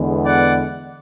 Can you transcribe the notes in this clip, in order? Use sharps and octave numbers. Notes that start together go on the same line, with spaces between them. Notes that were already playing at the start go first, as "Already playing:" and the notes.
Already playing: E2 D3 G#3 B3
D5 F#5